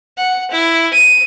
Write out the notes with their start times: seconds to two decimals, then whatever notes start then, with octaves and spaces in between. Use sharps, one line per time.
0.17 F#5
0.51 E4
0.94 D#7